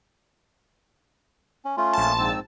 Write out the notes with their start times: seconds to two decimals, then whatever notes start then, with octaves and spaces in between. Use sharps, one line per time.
1.65 C#4
1.77 A3 C#4 F4 C6
1.93 A#1 A5
2.18 G#2 C4 E6